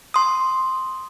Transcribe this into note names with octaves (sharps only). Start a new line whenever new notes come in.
C6 D#6